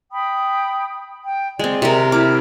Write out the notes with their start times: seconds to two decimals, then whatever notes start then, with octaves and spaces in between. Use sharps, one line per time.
0.12 G5 B5 D#6
1.26 G5
1.59 G#3 C4 D5
1.82 C3 A#4
2.12 E4 D6 F6